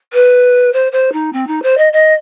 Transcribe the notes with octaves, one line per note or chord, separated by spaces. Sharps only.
B4
C5
C5
D#4
C4
D#4
C5
D#5
D#5